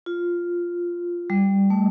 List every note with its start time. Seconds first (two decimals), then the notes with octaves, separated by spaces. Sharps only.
0.06 F4
1.30 G3
1.70 A3